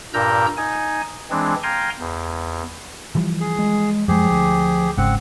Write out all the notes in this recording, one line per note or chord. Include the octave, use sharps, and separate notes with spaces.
G2 A#2 A#4 A#5 E6 G6
D#4 G#5
E3 G#3 C4 D4
F5 G5 G#5 A#5 C6
E2
E3 F3 G3
G#4
G#3
F#2 F3 G#3 G4 G#4
D2
G1 G#2 C#3 C4 F#5